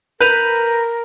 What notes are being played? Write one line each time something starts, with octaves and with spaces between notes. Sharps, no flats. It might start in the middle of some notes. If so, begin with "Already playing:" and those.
A#4 B4 G6 D#7 F7